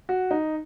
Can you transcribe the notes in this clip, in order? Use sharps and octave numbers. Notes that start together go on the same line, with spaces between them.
F#4
D#4